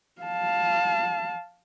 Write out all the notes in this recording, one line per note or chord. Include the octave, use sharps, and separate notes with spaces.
F5 A5